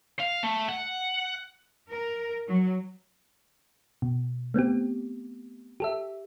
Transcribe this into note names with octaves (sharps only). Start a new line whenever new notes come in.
F5
A3
F#5
A#4
F#3
B2
A3 B3 C4 G4
G4 A4 E5